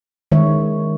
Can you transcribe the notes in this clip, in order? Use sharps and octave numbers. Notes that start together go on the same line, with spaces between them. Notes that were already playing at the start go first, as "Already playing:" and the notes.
D#3 G#3 C#5 E5